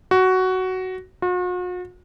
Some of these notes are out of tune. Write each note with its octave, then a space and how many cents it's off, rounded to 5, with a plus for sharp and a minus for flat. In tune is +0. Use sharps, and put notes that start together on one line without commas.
F#4 +10
F#4 -45